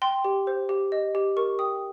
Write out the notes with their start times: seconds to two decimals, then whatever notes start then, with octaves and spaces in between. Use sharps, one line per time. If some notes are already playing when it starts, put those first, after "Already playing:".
0.02 G5 C6
0.24 G4
0.47 C5
0.69 G4
0.92 D#5
1.15 G4
1.37 A#4 C#6
1.59 G5 D#6